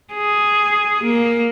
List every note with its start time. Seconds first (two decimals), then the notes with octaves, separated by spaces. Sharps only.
0.14 G#4
1.03 A#3